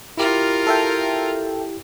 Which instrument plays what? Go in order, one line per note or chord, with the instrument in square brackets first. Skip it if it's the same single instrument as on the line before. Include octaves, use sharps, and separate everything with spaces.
[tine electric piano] E4 G4 [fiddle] F4 A#4
[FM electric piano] A4 E5 G5